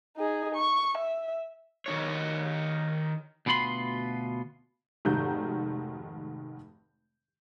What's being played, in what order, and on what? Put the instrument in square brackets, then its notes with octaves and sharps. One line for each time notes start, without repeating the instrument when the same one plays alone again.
[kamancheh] D#4 G#4
C#6
E5
[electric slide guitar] D#3 D#4 C#5
[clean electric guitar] D2 B2 B3 F4 B5 C6
[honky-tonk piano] F1 G#2 D#3 F#4 A#5 G6